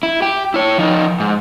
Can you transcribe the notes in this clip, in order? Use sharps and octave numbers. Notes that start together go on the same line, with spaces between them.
E4
G4
E4 C#5
F3 D#4
G#2